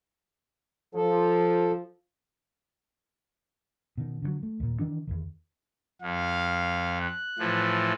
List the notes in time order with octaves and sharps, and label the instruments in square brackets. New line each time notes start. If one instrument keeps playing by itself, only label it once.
[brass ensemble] F3 [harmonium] A4
[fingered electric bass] B2 D#3
D3 E3 F#3
A3
D#2 A#2
D#3 E3 D4
E2 G#2 D#3
[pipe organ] F2 [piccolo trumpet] F5
[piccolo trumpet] F#6
[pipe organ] A2 E3 F3